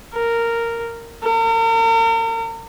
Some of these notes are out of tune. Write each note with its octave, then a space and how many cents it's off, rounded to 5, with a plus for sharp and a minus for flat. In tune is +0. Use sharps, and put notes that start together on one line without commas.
A#4 -10
A#4 -40